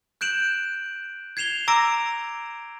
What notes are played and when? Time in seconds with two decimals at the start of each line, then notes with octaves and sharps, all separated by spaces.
0.21 F#6 G6 D7 E7 F#7
1.37 G#6 C7 E7 F7 G7
1.68 A#5 D6 E6 A#6 D7